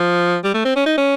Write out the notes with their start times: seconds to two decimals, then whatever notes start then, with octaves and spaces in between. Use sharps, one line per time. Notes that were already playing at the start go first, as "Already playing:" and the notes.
Already playing: F3
0.44 G3
0.54 A3
0.65 C4
0.76 C#4
0.86 D#4
0.98 C#4